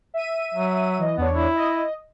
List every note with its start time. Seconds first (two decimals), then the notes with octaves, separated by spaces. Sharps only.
0.14 E5 D#7
0.54 F#3
0.99 E3 D#5
1.18 E2 B3 D4 C#5
1.33 E4
1.55 D#5